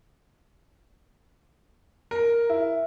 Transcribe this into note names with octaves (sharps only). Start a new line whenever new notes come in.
A#4
E4